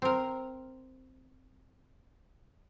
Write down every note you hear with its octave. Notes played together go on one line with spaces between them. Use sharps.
C4 A#4